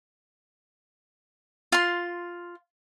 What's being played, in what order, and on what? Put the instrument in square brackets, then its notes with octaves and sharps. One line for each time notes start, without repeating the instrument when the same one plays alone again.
[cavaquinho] F4 C6